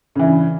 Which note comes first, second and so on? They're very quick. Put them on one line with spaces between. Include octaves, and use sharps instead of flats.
C#3 E3 G2